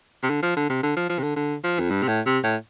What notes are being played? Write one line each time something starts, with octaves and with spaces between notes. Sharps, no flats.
C3
D3
F3
D3
C3
D3
F3
F3
C3
D3
D3
F3
F2
G2
C3
A2
C3
A2